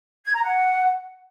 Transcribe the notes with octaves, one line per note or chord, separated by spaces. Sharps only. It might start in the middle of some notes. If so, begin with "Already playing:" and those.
G#6
A#5
F#5